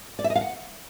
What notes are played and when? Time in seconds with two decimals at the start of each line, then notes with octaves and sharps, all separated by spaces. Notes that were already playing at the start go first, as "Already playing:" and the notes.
0.19 D5
0.24 E5
0.30 D#5
0.35 F5
0.41 F#5